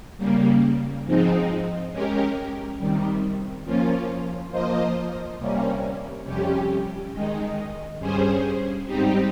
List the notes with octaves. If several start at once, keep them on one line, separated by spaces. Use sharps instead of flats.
C#3 G3 A#3
G#2 F3 G#3 C4 D#4
G#3 C#4 G4 A#4
C3 D#3 G3
F3 A#3 C#4 F4
F3 A#3 F4 C5 D#5
C3 G3 A#3 C#4
F2 C3 G3 C#4 G4
D#3 G#3 D#4
G2 G3 C#4 G#4 C5
G#2 G3 C4 D#4 G4